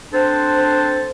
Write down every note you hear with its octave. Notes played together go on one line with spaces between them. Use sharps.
C4 D4 A4 C5